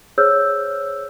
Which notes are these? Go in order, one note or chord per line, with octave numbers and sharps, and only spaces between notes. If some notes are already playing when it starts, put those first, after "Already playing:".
G#4 C5 C#5 E6 F6 G6